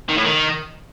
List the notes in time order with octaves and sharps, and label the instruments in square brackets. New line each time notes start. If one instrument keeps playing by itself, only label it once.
[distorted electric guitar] D#3
A2
D#3